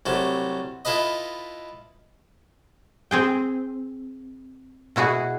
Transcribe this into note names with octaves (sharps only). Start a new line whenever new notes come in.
C2 F#3 A3
E4 F4 A4 B4 D#5
C4 G#4 G5
B2 E4 F#4 G#4